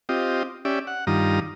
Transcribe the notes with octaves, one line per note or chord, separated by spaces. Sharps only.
C4 F4 G4 D#5
C#4 G4 D5 E5
F#5
G2 D#3 G3 F4 A#5 D#6